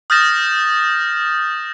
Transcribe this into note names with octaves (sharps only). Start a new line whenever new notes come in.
D#6 F6 G6 A6 A#6 E7